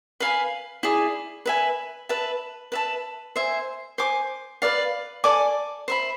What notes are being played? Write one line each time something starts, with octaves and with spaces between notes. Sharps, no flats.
B4 F5 G#5 B5
E4 G#4 D5
B4 E5 G#5
B4 E5 A5
B4 E5 A5
C5 E5 G#5
C5 G#5 D6
B4 D5 F5
A4 D5 G#5 D6
C5 E5 B5